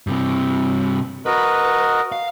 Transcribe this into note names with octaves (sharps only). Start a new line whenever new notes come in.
G2 C3
F#4 A#4 B4 D#5
F5